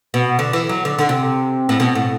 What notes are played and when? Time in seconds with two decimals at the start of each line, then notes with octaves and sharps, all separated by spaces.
0.14 B2
0.39 D3
0.53 E3
0.69 F#3
0.85 D3
0.99 D3
1.09 C3
1.69 A2
1.80 B2
1.95 A2